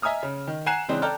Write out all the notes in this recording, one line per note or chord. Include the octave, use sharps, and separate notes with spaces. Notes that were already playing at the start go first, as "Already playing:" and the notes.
D#5 E5 G#5 A#5 D#6 F6
C#3
D#3
F#5 G#5 A#5 F#6 C7 E7
C#3 E3 G#3 C4 D4 D#4
A4 D5 G5 A5 A#5 F6